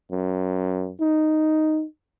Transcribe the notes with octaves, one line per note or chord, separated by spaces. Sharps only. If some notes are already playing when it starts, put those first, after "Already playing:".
F#2
D#4